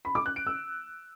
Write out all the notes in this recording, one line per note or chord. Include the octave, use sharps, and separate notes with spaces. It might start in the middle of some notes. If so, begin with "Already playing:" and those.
B5
D6
F#6
D7
E6